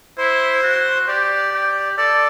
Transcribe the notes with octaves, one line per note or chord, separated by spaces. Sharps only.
E4 C5
F#4
G4 D5
G4
A4 D5